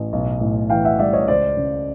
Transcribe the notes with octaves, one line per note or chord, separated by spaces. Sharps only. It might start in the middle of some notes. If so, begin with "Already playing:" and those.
Already playing: A1
B1
A2
E3 F5 G5
E5 F#5
G3 D5 E5
C#5 D#5
C#2 C5 D5
C#3